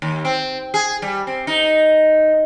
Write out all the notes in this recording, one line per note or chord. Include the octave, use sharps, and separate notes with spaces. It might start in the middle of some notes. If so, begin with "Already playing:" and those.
D#2
C4
G#4
G3
C4
D#4